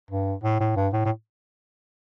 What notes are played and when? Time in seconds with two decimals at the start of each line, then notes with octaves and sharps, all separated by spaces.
0.11 G2
0.43 A2
0.60 A2
0.76 G2
0.93 A2
1.05 A2